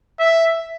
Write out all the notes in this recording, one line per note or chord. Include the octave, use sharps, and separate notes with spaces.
E5